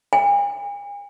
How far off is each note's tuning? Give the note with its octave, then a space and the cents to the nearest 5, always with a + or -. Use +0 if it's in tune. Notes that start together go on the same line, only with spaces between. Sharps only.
G#5 -45